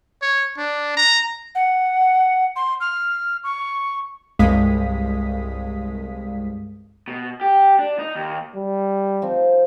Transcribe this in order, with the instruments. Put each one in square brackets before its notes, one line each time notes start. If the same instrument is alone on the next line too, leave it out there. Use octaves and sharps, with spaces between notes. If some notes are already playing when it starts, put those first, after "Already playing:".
[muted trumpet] C#5
D4
A#5
[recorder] F#5
C6
F6
C#6
[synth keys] C2 G2 G#3 F5 D#6 B6
[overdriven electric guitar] B2
G4
D4
D#4
D#2
[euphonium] G3
[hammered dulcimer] F3 C4 D#4